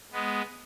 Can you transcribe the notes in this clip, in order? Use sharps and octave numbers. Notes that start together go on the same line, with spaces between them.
G#3 B3